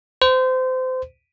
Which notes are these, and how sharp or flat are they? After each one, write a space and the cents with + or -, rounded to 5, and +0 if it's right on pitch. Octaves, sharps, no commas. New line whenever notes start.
C5 -25